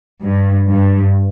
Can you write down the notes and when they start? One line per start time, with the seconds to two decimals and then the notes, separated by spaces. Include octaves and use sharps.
0.25 G2
0.69 G2